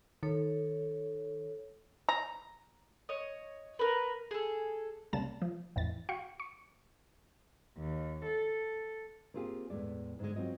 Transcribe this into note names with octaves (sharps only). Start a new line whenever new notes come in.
D#3 A4 C#5
A#5
C#5 D#5
A#4 B4
G#4 A4
C2 C#3 G3 A#3 A5 E7
F3
A1 F2 E3 A6
F#4 F5 G5 C#6
C#6
D#2
A4
A#3 C4 F4 G4 G#4
E2 A2 G#3 D5
G#2 D3 G#3
F#3 C4 F4 D#5